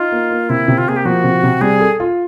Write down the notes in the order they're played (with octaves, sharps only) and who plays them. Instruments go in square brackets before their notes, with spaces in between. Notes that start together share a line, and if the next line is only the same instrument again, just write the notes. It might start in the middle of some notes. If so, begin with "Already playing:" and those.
Already playing: [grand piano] D#4 [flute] F4
[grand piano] A#3
A#3
[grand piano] C3 [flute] E4
[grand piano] C3
[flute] F4
[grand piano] A#3 [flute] G#4
[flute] G4
[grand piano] F3 [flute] F#4
[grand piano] C3
C3
[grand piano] G3 [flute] G#4
[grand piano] A4
F4